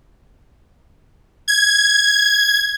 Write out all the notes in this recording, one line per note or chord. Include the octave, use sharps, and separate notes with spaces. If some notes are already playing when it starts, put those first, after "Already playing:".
G#6